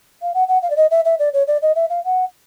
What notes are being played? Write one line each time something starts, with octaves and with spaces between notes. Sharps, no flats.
F5
F#5
F#5
F5
D5
D#5
E5
E5
D5
C#5
D5
D#5
E5
F5
F#5